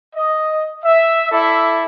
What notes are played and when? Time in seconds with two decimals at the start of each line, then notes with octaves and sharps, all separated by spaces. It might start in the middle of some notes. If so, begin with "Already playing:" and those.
0.14 D#5
0.84 E5
1.30 E4 A4 D5 E5